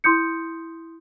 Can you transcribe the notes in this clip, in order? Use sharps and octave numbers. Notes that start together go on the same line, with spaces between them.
E4 C6 D#6 G6 C#7